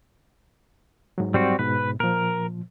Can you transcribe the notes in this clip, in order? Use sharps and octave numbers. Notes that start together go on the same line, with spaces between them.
G#2 F#3
G3 C4 F#4
G#2 B2 B4
A#2 F3 A#4